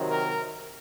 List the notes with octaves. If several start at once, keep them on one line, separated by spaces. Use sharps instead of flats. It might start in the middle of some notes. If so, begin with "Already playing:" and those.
Already playing: C3 D#3 F#3
A#4